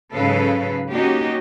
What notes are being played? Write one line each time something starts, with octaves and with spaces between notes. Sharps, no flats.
G#2 C#3 F#3 A4 B4 F5
A#3 C#4 D#4 F#4 G4